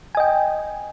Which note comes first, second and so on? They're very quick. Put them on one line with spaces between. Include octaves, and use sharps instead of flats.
G#5 D#5 G5